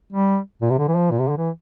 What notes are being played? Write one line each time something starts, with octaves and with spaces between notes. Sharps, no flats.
G3
A#2
C3
D3
E3
F3
A#2
C3
D3
E3